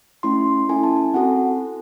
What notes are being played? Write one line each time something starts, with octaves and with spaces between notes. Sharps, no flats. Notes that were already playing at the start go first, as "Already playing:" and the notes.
A3 C#4 E4 C6
C#4 E4 A4 G#5
A5
G#5
C4 F#4 A4 F#5